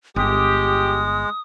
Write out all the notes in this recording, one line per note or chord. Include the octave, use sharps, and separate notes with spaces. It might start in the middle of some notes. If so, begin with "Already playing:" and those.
G1 G#3 G4 D#6